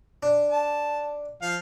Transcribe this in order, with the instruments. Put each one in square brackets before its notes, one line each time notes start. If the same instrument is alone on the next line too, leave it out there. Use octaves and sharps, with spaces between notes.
[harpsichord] D4
[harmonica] A5
F3 F5